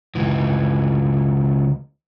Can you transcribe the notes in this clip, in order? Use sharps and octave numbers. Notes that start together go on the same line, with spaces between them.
C#2 E3